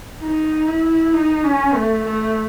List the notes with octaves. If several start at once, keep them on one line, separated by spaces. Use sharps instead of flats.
D#4
E4
D#4
C#4
A3
A3